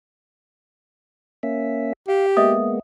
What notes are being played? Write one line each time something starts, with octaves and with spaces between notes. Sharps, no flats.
A#3 C#4 E5
G4 F5
G#3 A#3 B3 D#5 E5 D#6